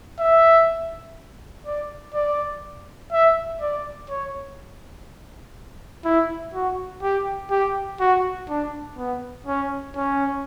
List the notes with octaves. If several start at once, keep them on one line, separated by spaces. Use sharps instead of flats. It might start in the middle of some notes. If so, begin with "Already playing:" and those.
E5
D5
D5
E5
D5
C#5
E4
F#4
G4
G4
F#4
D4
B3
C#4
C#4